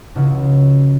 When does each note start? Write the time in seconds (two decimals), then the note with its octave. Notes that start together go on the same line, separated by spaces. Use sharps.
0.15 C#2 C#3 F3 D#4 E4 F#4